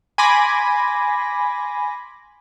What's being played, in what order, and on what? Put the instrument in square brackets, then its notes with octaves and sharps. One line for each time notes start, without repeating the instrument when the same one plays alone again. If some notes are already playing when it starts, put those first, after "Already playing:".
[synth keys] G#5 B5 C6 D6 A#6